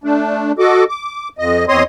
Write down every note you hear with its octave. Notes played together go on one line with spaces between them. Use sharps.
A3 D4
F#4 A4 D#5 D6
D6
F2 D#5
E2 C4 C#5 D#5 C6 D#6